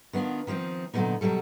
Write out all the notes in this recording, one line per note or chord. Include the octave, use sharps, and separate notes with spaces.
D#3 B3 C#4 D4 F4
D#3 F3 B3 C4 D#4
A#2 D3 F#3 A#3 B3 D#4
B2 D#3 F#3 G3 A4